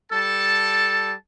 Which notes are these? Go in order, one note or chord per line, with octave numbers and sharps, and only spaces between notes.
G3 A4 A5